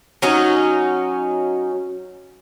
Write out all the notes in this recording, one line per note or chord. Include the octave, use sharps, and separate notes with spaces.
F#3 C#4 D#4